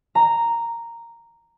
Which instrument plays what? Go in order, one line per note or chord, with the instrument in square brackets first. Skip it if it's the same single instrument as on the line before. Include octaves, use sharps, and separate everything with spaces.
[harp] A#5